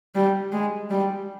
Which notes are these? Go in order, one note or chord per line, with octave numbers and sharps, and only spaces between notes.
G3
G#3
G3